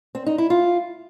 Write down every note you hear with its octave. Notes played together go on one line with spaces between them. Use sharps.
C4
D#4
E4
F4